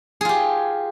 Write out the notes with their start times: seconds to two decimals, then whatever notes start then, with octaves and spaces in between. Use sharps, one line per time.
0.21 G#4
0.25 F4
0.29 G4